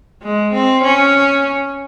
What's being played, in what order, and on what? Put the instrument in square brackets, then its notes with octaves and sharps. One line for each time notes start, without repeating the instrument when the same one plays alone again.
[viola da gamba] G#3
C4
C#4